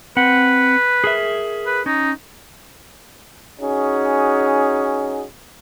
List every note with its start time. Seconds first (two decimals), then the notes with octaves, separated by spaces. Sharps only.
0.17 C4 B4 F#5
1.04 G#4 A#4 E5
1.66 B4
1.86 C#4 D#4
3.61 C#4 D#4 F#4 G#4